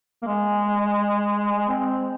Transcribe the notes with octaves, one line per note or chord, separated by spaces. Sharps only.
A#3
G#3
C4